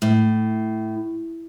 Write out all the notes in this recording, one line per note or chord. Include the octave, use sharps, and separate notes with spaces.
A2